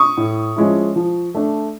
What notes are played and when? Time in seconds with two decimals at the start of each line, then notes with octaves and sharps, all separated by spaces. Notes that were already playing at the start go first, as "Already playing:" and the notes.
Already playing: C#6 D#6
0.17 A2
0.56 F3 G#3 C#4 E4
0.96 F3
1.35 A3 D4